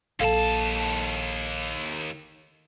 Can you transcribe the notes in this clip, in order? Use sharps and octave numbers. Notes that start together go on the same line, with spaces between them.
A#1 D#2 A#3 A4 F5 A5